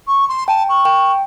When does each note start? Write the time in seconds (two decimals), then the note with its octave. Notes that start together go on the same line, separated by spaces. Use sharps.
0.07 C#6
0.29 C6
0.48 G5 A5
0.69 C#6
0.85 G5